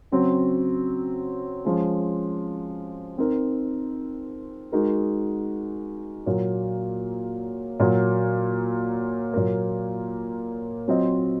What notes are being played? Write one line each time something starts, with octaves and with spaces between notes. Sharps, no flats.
C#3 F#3 C4
F3 G#3 C#4
C4 D#4 A#4
G#3 D#4 F#4 A#4
A#2 F#3 A#3
A#2 F#3 A#3
A#2 F#3 A#3
F#3 C4 F4 C5 D#5